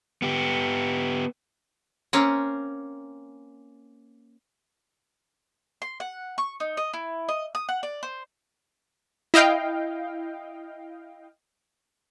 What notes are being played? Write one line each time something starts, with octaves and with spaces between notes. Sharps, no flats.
B3 G4
A#3 C4 C#4
C6
F#5
C#6
D#4
D#5
E4
D#5
D#6
F#5
D5
C5
E4 D#5 F5 G5